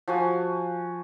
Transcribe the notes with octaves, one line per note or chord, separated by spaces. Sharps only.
F3 F#4 G#5